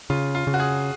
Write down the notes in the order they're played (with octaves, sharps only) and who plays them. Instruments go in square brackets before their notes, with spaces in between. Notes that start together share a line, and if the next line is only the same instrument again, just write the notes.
[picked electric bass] C#3 [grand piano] F4
[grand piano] F4
[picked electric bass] C#3
[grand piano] F#4
G#4